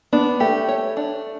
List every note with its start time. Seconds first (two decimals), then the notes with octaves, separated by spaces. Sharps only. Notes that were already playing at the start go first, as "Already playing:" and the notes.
0.13 B3 D4
0.40 A3 G4
0.68 C#5
0.97 D4